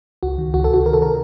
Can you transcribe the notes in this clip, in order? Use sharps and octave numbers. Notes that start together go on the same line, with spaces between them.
C#2 F#4
D#3
C#2 F#4
A4
C3 F#4
D#3 A#4
A4
A#4